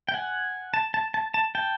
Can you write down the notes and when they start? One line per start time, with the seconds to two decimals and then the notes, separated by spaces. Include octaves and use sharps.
0.09 G5
0.14 F#5 G#5
0.74 A5
0.94 A5
1.14 A5
1.34 A5
1.55 G5 A5